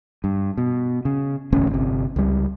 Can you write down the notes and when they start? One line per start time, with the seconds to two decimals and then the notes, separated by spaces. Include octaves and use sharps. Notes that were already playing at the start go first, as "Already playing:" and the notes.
0.24 G2
0.58 B2
1.05 C#3
1.52 E1 A1 D2 C#4
1.71 G1 C3
2.16 C#2 G3